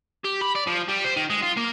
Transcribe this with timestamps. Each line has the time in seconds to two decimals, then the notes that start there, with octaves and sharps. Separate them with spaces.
0.25 G4
0.42 B5
0.56 D5
0.67 F3
0.88 G3
1.05 C5
1.17 D#3
1.30 G#3
1.42 F4
1.57 A#3